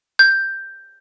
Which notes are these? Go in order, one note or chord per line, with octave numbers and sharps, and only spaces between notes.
G6